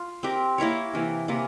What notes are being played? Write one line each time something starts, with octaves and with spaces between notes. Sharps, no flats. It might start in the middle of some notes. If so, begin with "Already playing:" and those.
Already playing: F4
C4 G4 A#4
A#3 E4 A#4 C#5
C3 E3 A#3
C3 E3 A#3